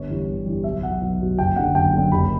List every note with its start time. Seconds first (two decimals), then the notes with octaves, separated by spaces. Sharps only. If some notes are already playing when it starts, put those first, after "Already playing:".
Already playing: G1 C#5
0.09 G2 E3 G3
0.28 G1
0.45 G2 E3 G3
0.64 B1 E5
0.82 B2 F#3 F#5
1.01 B1
1.20 B2 F#3
1.38 F#1 G5
1.56 F#2 D3 F#5
1.75 F#1 G5
1.94 F#2 D3
2.12 F#1 B5